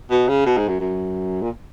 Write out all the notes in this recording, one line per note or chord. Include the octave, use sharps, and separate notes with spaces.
B2
C#3
B2
G#2
F#2
F#2
A#2